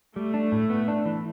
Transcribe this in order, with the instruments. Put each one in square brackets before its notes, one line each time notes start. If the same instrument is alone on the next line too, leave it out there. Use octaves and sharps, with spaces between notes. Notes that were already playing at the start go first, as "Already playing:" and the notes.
[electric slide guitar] G3 [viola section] A3
[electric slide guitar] D4
A2
B3
D4
E3